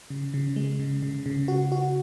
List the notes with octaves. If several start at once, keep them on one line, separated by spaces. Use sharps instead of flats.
C#3
C#3
G#3
C#3
C#3
C#3
F#4
F#4